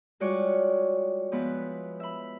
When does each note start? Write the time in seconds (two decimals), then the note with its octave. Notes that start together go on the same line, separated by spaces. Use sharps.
0.20 G3 G#3 F4 F#4 C#5 D5
1.32 F3 G#3 B3 E4 B4
2.00 E5 B5